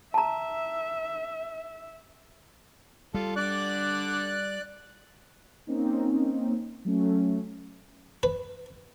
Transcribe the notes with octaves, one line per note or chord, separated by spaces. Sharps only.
E5 A5 A#5
G3 F4 A4
D3 D5 D6 F#6
A#3 C4 C#4 D#4
F#3 A3 C#4
B4